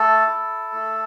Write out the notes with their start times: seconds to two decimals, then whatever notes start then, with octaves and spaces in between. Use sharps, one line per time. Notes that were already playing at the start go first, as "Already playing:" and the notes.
Already playing: A3 A4 A5
0.27 E4
0.72 A3